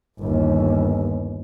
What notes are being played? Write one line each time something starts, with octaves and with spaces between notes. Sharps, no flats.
G1 D#2